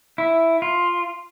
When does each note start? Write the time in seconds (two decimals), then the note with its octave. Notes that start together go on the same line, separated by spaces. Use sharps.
0.18 E4
0.62 F4